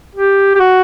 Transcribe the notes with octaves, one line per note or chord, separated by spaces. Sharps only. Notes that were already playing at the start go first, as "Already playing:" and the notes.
G4
G4
F#4